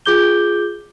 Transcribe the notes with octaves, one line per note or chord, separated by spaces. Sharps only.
F4 G#4 D6 G6 G7